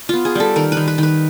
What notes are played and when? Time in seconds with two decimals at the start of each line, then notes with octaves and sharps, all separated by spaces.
0.09 B3 F4
0.25 G#4
0.35 G3 A4
0.56 D#3 A#4
0.72 D#3 B4
0.88 B4
0.98 D#3 B4